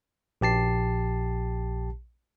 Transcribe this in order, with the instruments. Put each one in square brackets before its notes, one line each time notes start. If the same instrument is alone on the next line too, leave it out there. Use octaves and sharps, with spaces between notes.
[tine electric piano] A#1 G4 A5 C7